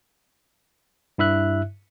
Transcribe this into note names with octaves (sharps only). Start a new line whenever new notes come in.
G2 E4 E5 F#6